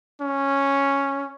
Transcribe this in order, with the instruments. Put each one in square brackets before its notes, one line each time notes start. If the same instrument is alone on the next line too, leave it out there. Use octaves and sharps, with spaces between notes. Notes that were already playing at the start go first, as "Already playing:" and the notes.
[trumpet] C#4